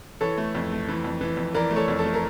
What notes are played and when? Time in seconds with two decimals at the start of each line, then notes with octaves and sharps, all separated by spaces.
0.21 E3 A4 C#5
0.38 A3
0.55 F2
0.72 A3
0.88 E3
1.04 F2
1.21 E3
1.37 F2
1.54 E3 A#4 D5
1.71 A3
1.76 A4 C#5
1.88 F2
1.99 A4
2.05 A3
2.14 A#4